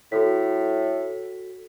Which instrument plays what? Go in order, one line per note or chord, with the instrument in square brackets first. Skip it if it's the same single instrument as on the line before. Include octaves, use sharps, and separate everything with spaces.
[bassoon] A2 [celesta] F#4 A4 B6